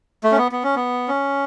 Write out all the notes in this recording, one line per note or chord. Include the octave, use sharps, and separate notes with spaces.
A3
C#4
B3
B3
C#4
B3
C#4